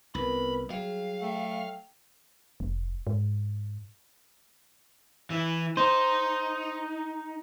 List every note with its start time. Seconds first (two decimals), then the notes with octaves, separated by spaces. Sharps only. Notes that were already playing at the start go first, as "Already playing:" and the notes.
0.15 C2 B3 A#4 B4 B5
0.70 F#3 G3 G#4 F5
1.21 A3 G5
2.60 F1
3.07 G#2
5.30 E3
5.77 D#4 C5